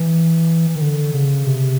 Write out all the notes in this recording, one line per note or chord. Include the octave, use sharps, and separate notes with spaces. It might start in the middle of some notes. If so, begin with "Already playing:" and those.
Already playing: E3
D#3
D3
C#3
C3